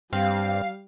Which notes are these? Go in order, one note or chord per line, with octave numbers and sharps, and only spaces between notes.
G2 G3 C4 F5